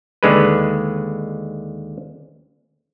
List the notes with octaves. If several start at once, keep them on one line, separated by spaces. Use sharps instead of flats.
D#2 D3 G#3 B4